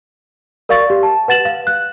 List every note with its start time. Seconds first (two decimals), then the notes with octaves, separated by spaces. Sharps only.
0.69 A#4 D5 F5 C#6 A6
0.90 G4
1.03 A5
1.28 B4 F#5 A6 E7 F#7
1.45 F5
1.67 F#6